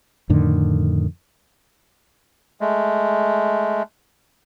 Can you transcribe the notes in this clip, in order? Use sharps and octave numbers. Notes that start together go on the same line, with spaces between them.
F2 A2 D3 D#3
G#3 A3